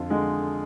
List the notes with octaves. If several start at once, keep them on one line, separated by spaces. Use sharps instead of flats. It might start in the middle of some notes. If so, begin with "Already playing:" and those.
Already playing: F2 D3 F4
D3 G#3